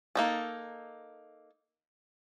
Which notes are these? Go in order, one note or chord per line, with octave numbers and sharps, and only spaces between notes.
A#3 D#4 A4